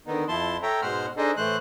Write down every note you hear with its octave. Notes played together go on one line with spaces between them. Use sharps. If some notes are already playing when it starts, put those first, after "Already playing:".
D3 D#3 B3 D#4
F2 F3 E4 A5 C6
A4 C#5 E5 G5 A#5
G#2 B2 G#3 C5 F#5 F6
D4 D#4 G#4 A4 C5 D#5
A2 E3 A3 C5 F#6